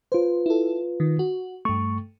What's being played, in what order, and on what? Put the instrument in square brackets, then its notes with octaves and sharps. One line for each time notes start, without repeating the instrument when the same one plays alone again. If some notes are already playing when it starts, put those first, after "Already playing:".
[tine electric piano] F4 B4 [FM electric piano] C5
[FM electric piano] E4 A4
D#3
F#4
[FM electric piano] G2 A3 [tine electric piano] C#6